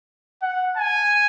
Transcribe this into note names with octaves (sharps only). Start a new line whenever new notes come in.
F#5
G#5